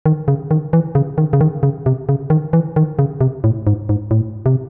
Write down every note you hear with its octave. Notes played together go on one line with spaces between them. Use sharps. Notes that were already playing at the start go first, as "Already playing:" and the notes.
D#3
C#3
D#3
E3
C#3
D#3
C#3
D#3
C#3
C3
C#3
D#3
E3
D#3
C#3
C3
A2
G#2
G#2
A2
C3